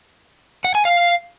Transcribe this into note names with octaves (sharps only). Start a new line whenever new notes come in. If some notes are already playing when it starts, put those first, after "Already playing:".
F#5
G#5
F5